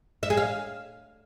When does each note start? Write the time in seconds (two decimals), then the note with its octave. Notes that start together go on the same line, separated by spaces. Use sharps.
0.23 E5
0.30 G#4
0.37 F5